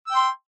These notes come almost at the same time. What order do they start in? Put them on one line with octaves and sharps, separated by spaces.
E6 G5 C6